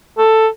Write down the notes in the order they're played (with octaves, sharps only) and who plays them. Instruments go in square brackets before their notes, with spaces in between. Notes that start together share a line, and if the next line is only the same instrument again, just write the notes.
[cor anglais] A4